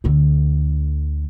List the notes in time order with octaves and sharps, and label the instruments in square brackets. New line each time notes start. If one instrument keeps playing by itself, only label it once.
[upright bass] D2 D3